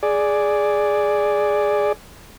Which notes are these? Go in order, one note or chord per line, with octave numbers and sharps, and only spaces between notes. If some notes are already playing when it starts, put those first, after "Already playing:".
G#4 D5